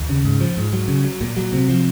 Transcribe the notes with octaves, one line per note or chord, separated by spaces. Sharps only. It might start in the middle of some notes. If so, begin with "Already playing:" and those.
Already playing: D#2
C#3
G#2
F3
G#2
F#3
C#3
F#3
A#2
F#3
C3
F3